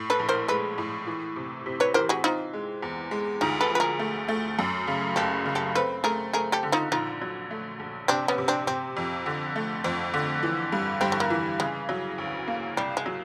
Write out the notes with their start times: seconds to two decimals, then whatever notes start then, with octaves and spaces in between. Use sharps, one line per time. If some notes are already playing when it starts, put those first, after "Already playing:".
Already playing: A2
0.10 A4 B4
0.19 A#1
0.29 A#4 C5
0.48 G#3 A4 B4
0.78 A2
1.07 E3
1.36 C3
1.66 C3
1.80 B4 C#5
1.94 E3 A#4 C5
2.09 F#4 G#4
2.24 C4 D#4 F4
2.54 G#3
2.82 E2
3.11 G#3
3.41 D2 D#4 F4
3.61 A4 B4
3.70 F3
3.75 B4
3.80 G#4 A#4
3.99 A3
4.28 A3
4.59 F#2
4.87 C#3
5.16 F#1 G4 A4
5.46 C#3
5.55 G4 A4
5.75 C4 A4 B4
6.04 A3 G#4 A#4
6.33 A3 G#4 A#4
6.52 G4 A4
6.63 D3
6.72 D#4 F4
6.92 A#1 D#4 F4
7.22 F#3
7.51 A3
7.80 A#1
8.08 C3 C4 D4
8.28 B3 C#4
8.38 C3
8.48 C4 D4
8.67 C3 C4
8.97 F2
9.26 D3
9.56 A3
9.84 F2 C4
10.14 D3
10.43 E3
10.72 G2
11.01 G2 C4
11.12 A3
11.20 A#3
11.30 E3
11.59 C#3 G#3
11.89 F#3
12.18 D2
12.47 A#3
12.77 C2 G3
12.97 G#3
13.06 F#3